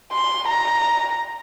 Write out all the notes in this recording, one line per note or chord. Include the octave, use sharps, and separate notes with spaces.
C6
A#5